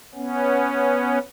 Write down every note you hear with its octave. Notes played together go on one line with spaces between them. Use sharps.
B3 C#4